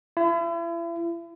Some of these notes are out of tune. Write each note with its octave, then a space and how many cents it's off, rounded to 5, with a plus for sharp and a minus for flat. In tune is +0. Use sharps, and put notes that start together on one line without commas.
E4 +40